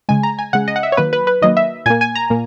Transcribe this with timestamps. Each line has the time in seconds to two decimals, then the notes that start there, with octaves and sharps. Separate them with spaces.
0.09 C#3 G#3 G#5
0.23 A#5
0.39 G#5
0.53 C#3 G#3 F#5
0.68 D#5
0.76 F#5
0.83 E5
0.92 C#5
0.97 D#3 F#3 A#3 B4
1.13 B4
1.27 B4
1.42 D#3 F#3 A#3 D#5
1.57 E5
1.86 A#2 A#3 G#5
2.01 G#5
2.15 A#5
2.30 A#2 A#3